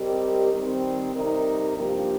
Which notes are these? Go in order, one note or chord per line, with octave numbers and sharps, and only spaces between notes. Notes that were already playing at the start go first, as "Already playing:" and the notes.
Already playing: G3 C4 G4 A#4 D#5
D#3 G3 C4
C3 G3 D#4 A#4
G2 F3 A#3 G4